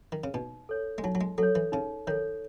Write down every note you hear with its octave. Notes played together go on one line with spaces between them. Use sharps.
D#3
C#3
B2 D#4
A4 C#5
G#3
F#3 D#4
F#3
G#3
F#3 A4 C#5
E3
C#3 D#4
D#3 A4 C#5